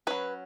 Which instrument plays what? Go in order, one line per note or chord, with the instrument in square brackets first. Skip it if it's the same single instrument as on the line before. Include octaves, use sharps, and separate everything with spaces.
[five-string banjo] F#3 C#4 B4